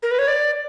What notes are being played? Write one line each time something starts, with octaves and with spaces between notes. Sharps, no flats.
A#4
B4
C#5
D5